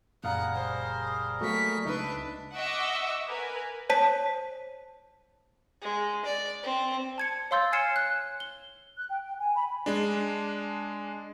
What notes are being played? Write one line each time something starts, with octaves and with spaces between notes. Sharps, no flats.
F#1 A#2 G3 G#4 A#4 F5 F#5 A#5
C5
F#3 A3 A#3 C#6 B6
C#2 D4 D#4 B4 E5
D#5 E5 F#5 C#6 D6 E6
A#4 B4 G#5
C5 C#5 A5 B6
G#3
D5
C4
A5 G#6 C#7
C#5 F5 C6 E6 G6 A6
G#5 F6 G#6 C7 C#7 E7
F#6
G7
F#6
G5
G5
G#5
B5
G#3 D4